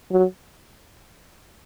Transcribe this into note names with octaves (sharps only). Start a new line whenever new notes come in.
F#3